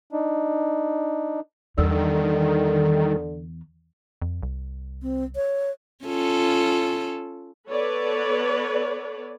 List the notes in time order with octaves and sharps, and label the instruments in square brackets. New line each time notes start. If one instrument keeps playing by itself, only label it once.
[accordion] D4 D#4
[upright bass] E2 [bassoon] D3 [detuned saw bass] D#3 [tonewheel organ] G3 A4
[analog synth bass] F2
C2
[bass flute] C4
C#5
[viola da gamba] C#4 F4 A4
[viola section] B3 A4 B4 C#5 D5